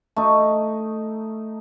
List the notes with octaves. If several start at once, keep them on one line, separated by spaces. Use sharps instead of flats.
A3 D#4